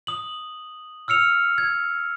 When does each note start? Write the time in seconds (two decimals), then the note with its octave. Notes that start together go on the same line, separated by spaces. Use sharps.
0.07 D#6 F#7
1.08 E6 F6 C#7 F7
1.58 G#6